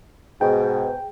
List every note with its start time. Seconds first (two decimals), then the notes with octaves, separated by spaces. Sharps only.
0.41 G#2 B2 G#4 G5